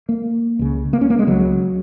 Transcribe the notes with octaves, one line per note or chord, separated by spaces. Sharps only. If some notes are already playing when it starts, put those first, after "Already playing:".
A#3
C#2 C#3
A#3
C#4
A#3
G#3
C#2 C#3 F#3